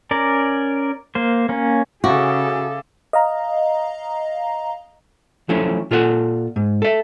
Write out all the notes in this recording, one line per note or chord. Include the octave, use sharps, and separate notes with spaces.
C#4 A#4 D5
A#3 C5
A#3 C#4
C#3 F#4 G#4 A4 E5 F5 D6
D#5 F5 A#5
F3 F#3 A3 C#4 E4
A#2 F4 A4 D5 F#5
G#2
A4 E5